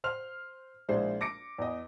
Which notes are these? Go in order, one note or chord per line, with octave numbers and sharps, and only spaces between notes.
C5 C6 F6 F7
A#1 G#3 E4 C5 C7
D6 A#6 C#7 D7
E2 D#5